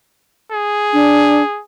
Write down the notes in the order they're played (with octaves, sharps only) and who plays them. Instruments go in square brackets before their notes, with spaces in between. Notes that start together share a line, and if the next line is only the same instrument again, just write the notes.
[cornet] G#4
[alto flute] D4